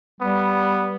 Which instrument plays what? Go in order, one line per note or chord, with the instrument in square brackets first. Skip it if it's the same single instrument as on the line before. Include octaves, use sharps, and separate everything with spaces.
[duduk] G3 [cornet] B3